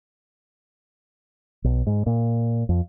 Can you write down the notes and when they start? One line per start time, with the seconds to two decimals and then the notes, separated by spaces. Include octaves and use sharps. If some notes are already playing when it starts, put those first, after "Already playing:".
1.64 B1
1.87 G#2
2.06 A#2
2.69 F2